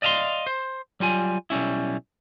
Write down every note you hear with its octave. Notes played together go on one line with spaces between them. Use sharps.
D5 D#5 F5 G#5 C6
C5
F#3 G3 F4 G#5
B1 G3 C#4 E4